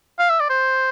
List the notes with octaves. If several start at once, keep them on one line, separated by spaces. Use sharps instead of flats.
F5
E5
D5
C5